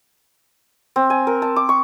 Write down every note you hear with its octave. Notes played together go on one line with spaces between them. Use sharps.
C4
G#5
A#4
A5
D6
C#6